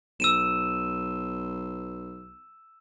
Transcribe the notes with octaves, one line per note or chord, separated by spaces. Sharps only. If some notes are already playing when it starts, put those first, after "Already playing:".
B1 E6 D#7 E7